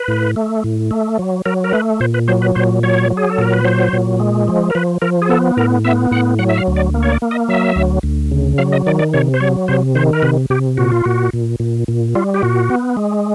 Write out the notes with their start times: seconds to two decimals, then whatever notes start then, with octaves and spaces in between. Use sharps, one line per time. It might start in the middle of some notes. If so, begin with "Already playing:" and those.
Already playing: B4
0.08 A2
0.36 A3
0.64 A2
0.91 A3
1.19 F#3
1.46 F#3 A#4
1.64 A#4
1.73 A3 B4
2.00 A#2 C5
2.14 B4
2.28 F#3 C5
2.42 B4
2.55 A#2 C5
2.83 F#3 C#5
3.10 F#3
3.17 G#4
3.30 A4
3.38 A#2 A#4
3.53 B4
3.65 F#3 C5
3.93 A#2
4.20 G#3
4.48 F3
4.70 A#4
4.75 F3 B4
5.02 F3 A#4
5.22 G#4
5.29 B3 A4
5.57 A2 A#4
5.85 B3 E5
6.11 A2 F#5
6.39 F#3 F#5
6.49 E5
6.57 F5
6.67 D2
6.76 D5
6.94 A#3
7.03 C#5
7.12 D5
7.22 A#3
7.31 D#5
7.48 F#3 E5
7.76 D2
8.03 D2
8.31 C#3
8.58 F#3 F5
8.72 D#5
8.86 D#3 D5
8.99 D5
9.14 C3 C#5
9.34 C5
9.40 F#3 C#5
9.68 C3 C5
9.95 D#3 C5
10.13 A#4
10.23 C3 B4
10.50 C3 G4
10.77 A#2 F#4
10.92 F4
11.05 A#2 F#4
11.33 A#2
11.60 A#2
11.88 A#2
12.15 G3 F4
12.34 G4
12.42 A#2 F#4
12.70 B3
12.97 G#3